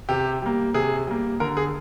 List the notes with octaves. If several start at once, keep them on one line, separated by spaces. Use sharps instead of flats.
C3 G4
G3 A#3
C3 G#4
G3 A#3
D3 A#4
G#4